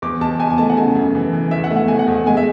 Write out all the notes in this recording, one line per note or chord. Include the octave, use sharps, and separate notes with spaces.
E2 D6
E2 A5
E2 G#5
G#5
A3 A5
F#5
C#3 G#5
F#2
E3
E3
E2 E5
F#5
A3
F#5
E2 G#5
F#5
E2
G#3 G#5
E5